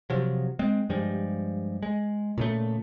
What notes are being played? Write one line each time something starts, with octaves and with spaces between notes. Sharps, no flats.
C3 F3 F#3
G#3 C4
G2 F3 G3 G#3
G#3
A#2 C#3 A3